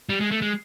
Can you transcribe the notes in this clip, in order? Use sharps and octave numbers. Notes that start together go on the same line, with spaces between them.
G3
G#3
A3
G#3